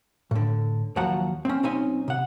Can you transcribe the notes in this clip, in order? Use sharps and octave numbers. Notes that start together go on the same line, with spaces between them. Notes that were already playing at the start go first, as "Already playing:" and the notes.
A2 D3
D#2 F3 F#3 F#5 A#5
C4 C#4
B1 C4 C#4 D#4 G#5
C3 F#5